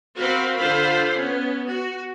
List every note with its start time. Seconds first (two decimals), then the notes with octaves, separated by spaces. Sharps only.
0.16 C4 F#4 A#4 F5 B5
0.56 D3 F4 C5 F5 B5
1.14 B3 C#4
1.67 F#4